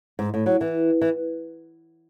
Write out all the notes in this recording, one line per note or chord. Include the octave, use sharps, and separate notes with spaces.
G#2
A2
F#3
E3
E3